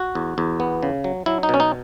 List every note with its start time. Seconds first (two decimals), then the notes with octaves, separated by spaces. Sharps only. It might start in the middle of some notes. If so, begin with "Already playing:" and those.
Already playing: F#4
0.15 E2
0.38 E2
0.60 B3
0.83 C#3
1.04 F#3
1.26 F#3 E4
1.43 D#4
1.49 B2 C#4
1.60 D#4